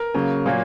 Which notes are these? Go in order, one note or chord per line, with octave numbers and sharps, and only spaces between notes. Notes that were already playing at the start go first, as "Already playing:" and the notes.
Already playing: A#4
C#3 F#3 A#3
A#2 F#3 A#3